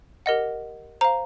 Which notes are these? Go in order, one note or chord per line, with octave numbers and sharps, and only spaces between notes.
G4 A#4 D#5 F#5
C5 F5 A#5